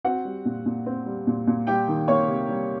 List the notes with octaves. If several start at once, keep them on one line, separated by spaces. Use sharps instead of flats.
C4 F#4 F#5
G3
A#2
A#2
C4
G3
A#2
A#2
G3 G4 G5
D#3
A#3 C#5 C#6
C3
G3